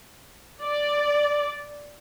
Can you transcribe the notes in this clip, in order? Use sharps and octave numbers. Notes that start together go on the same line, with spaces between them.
D5